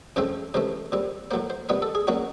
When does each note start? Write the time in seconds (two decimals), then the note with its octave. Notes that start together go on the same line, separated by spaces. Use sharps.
0.16 F#2 C#3 F3 A3 C4 C5
0.54 C#2 C3 E3 A3 C5
0.92 A#2 G3 C4
1.31 A2 F#3 A#3 C5
1.50 C5
1.69 C2 A#2 G3 B3 B4
1.82 A4
1.95 G#4
2.07 A#2 F#3 A#3 C#4 F#4